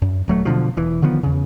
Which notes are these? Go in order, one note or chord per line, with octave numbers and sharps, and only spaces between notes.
F#2
D#1 F#3 A3
B2 D3 F3
E1 E3
D3 D#3 F3 B3
E2 C#3